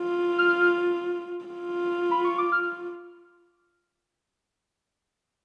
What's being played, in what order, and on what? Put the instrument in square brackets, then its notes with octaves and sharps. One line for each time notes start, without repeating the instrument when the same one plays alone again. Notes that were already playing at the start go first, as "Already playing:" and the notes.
Already playing: [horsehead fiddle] F4
[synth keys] F6
[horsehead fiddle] F4
[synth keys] B5
C#6
D6
F6